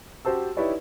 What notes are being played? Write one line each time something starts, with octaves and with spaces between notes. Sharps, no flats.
F#4 G4 C5 A5 E6
D#4 E4 G4 B4 C#5 D5